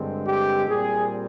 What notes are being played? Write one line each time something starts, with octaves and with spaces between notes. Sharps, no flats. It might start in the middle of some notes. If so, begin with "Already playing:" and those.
Already playing: G2 D3 G#3 C4
G4
A#2 G3 C4 G#4